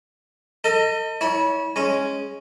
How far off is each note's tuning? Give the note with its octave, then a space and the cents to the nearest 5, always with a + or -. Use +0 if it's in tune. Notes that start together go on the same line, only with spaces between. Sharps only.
A4 +40 D#5 +5
E4 -30 C#5 +20
G#3 +0 C#4 -5